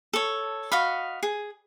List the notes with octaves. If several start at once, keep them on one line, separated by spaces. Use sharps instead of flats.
A4 C#5
F#4 D#5 F5 B5
G#4